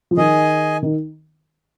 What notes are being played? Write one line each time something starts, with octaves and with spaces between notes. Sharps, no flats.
F3
D#3 G#4 D#5 G#5
D#3